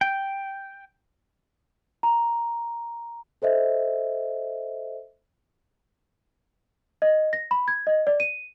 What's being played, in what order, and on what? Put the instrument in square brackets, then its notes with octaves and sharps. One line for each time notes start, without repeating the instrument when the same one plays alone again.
[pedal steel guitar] G5
[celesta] A#5
A4 C5 D#5 E5
D#5
A#6
B5
G#6
D#5
D5
D#7